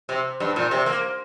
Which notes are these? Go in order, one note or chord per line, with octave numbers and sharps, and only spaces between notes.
C3
G2
A#2
C3
A#3